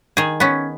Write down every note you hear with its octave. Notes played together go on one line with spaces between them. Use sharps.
D#3 G#4
B3 C#4